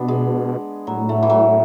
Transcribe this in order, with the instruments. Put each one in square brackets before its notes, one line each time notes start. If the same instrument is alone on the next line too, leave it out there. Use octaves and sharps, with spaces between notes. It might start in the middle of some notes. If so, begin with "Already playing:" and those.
Already playing: [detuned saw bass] B2 [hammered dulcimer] B3 D4
[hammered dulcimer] G#3
[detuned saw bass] A2 [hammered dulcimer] F#3
[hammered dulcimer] A3
E3
F#3